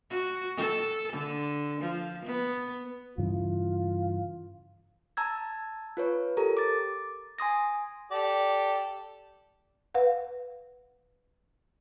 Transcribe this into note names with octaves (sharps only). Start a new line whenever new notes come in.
F#4
A4
D3
F3
B3
G2 C#3 E3 F4
A5 A#5 E6 G#6
F4 B4 C#5
G4 A4 A#4 A#5
D6 A6
G#5 C6 D#6 A#6
G4 A4 D5
B4 F5 F#5